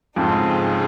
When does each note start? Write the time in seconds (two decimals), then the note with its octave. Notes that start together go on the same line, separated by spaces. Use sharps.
0.16 F2 G#2 C#3 G#3 C4 D#4